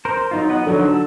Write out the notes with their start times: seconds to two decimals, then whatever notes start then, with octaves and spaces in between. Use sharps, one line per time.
0.05 A#4 C5
0.31 F#3 D#4 F4
0.49 B3 D#5 F#5
0.67 D3 F3 F#3 D#4
0.88 A4